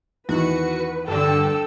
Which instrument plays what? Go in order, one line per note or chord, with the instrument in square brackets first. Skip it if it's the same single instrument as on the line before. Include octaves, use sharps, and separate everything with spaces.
[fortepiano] E2 D#3 [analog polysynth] F#4 C#7 [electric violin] B4
[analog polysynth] G2 D3 [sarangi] A4 [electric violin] G5 E6